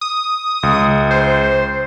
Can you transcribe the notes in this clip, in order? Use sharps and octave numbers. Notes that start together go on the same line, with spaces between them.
D#6
C#2
C5